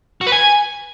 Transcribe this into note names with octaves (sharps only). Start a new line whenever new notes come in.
F#4
B4
G#5